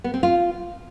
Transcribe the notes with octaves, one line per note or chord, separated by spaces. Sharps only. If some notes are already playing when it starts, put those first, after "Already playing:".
B3
C4
F4